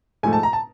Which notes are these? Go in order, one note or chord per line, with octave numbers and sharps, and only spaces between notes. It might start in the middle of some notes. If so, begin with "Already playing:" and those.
G#2 F3 A3 G#5
A5
A#5
A5